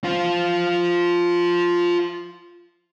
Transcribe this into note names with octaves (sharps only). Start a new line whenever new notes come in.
F4 C5